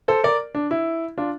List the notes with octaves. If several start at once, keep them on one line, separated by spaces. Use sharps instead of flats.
A4 C5
A#4 D5
D4
E4
D4 F4